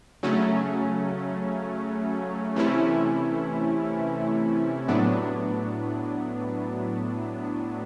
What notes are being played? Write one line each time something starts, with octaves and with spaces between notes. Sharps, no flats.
C#3 F#3 A3 C#4
C3 E3 A3 C#4 E4
A2 F#3 B3 D4